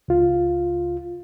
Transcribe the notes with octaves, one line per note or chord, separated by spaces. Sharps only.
C#2 F4